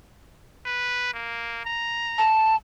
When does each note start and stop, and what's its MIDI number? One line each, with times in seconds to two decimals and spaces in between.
0.66 1.09 71
1.14 1.61 58
1.65 2.28 82
2.18 2.56 81